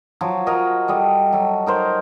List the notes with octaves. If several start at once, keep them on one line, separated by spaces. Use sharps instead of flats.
F3 F#3
F#3 A#4 D#5
G3 A4 D#5
F#3 A4
D#4 A#4 C5